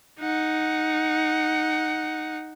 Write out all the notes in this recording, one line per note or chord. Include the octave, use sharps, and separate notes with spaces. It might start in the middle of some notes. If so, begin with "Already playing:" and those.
D#4 F#5